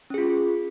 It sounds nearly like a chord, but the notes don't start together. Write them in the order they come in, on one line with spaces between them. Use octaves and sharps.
C#4 G#4 F4